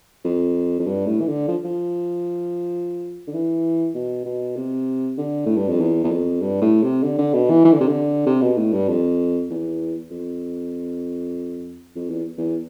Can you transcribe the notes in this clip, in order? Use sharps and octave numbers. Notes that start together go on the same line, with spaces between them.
F2
F2
G2
A2
E3
D3
F3
F3
D3
E3
B2
B2
C3
D3
A2
G2
F2
E2
E2
F2
G2
A2
C3
D3
D3
B2
E3
E3
D3
C3
D3
C3
B2
A2
G2
F2
E2
F2
F2
E2
E2